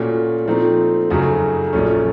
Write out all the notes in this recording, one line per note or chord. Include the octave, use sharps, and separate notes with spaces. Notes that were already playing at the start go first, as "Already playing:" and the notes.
Already playing: A#2 A3 C#4 F#4
A#2 F3 A3 C4 D#4
F#2 C#3 A3 D#4 F#4
A#1 A#2 F#3 A3 C#4